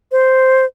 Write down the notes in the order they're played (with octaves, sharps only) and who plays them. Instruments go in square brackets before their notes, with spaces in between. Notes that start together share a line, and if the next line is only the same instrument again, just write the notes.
[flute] C5